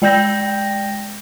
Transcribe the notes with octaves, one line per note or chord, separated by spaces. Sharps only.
G#3 D5 G5 G6 A#6